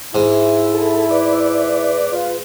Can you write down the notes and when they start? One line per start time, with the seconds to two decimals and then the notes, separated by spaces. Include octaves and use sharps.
0.15 G#2 E4
0.74 A4
1.11 B4 D5
2.12 F4